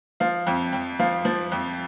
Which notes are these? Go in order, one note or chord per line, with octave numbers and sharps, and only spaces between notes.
F3 F5
F2
F2
F3 F5
F3
F2